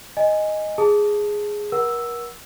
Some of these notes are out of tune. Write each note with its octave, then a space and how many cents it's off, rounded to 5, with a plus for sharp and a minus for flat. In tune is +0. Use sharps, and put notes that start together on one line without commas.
D#5 +0 G#5 -5
G#4 +0 A5 +0 D#6 +0
A#4 +35 F#5 +0 E6 +0